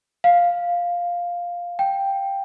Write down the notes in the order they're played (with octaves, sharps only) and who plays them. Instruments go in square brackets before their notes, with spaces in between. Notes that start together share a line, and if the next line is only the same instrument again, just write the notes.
[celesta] F5
G5